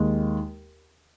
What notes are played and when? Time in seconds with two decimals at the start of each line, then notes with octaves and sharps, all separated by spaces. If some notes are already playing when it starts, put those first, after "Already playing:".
Already playing: D#2 D#3 G#3